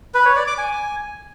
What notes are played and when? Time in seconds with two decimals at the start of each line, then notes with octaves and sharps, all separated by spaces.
0.14 B4
0.25 C#5
0.36 D5
0.47 D6
0.58 G#5